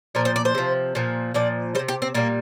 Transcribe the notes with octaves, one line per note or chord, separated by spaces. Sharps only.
A#2 F3 A#4
C5
D5
C5
C3 F3
A#2 F3
A#2 F3 D5
G3 C5
C3
G4
C4
A#2 G3 A#3